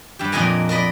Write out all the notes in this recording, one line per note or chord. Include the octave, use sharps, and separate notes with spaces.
G2 G4
F2 A#2 A#4 D#5 G#5 A#5
A#4 D5 D#5 B5